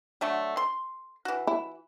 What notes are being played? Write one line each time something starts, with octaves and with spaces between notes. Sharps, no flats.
D3 F#3 A3
C6
E3 F#4
E4